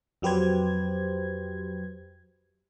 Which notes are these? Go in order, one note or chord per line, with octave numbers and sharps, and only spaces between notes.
F2 F#3 G4 B4 C5 G#6